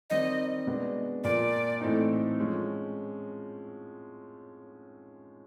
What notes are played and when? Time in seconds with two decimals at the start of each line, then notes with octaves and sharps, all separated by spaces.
0.10 D#3 G3 C4 D#4 D#5
0.67 B2 G#3 B3 D4
1.24 A#2 F3 A#3 D5
1.81 A2 E3 A3 C4 D#4
2.38 F3 G#3 C#4